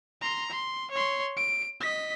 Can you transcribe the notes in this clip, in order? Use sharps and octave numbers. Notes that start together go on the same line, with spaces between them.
A#5 C6
C6
C#5 C6
D7
D#5 B6